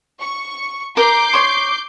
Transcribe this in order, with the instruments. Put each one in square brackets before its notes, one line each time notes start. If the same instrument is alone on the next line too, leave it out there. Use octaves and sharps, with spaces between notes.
[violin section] C#6
[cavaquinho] A#4 [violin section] D6 G6 C7
[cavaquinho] C#5 C6